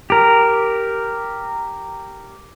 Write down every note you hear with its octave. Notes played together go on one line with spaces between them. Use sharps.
G4 A#4